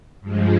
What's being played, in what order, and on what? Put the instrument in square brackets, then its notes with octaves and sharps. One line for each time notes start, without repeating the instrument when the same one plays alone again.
[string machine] G2 F3 G#3